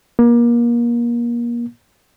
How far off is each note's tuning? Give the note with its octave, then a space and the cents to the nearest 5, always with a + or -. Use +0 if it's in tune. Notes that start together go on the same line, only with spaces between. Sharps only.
A#3 +30